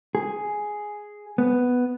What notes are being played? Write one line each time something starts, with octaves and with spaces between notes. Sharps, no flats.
G#4
B3